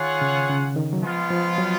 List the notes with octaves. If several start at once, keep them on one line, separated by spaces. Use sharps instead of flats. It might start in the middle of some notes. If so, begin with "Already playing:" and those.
Already playing: D#3 F4 G#4 C#5 F#5
C#3
C#3
D#3
F#3
F3 G#3 B3 F4
F3
F#3